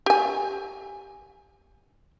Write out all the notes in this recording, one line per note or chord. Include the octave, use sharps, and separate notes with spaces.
G4 G#5